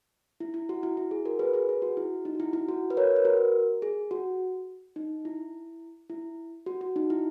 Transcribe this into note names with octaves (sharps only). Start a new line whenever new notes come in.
E4
E4
F#4
E4
E4
G#4
F#4 A#4
G#4 B4
G#4 B4
G#4
F#4
E4
D#4
F#4
E4
E4
F#4
B4
A#4 C#5
B4
F#4 A#4
G#4
F#4
D#4
E4
E4
F#4
F#4
D#4
E4